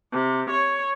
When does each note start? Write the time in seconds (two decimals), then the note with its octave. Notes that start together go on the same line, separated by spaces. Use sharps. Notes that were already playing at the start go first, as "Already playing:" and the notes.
0.13 C3
0.50 C#5